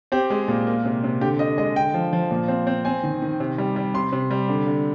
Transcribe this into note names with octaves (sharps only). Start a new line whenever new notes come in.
C4 G4
G#3
A#2
A#3
C3
C3
D3 G4
D3 D#5
G#3 D#5
D3 G5
F3
F3
A#2
C4
C4
C4 G#5
D#3
D#3
C3
G3
G3
C3 C6
C3
G3
D3
D3